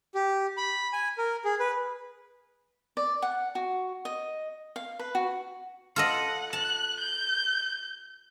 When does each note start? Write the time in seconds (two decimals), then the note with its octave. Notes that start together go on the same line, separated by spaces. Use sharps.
0.15 G4
0.57 B5
0.93 G#5
1.18 A#4
1.45 G#4
1.60 B4
2.97 D5
3.22 F#5
3.55 F#4
4.05 D#5
4.76 F5
4.99 B4
5.15 F#4
5.96 F4 A4 D#5 F#5
6.53 A5 F#6
7.00 G6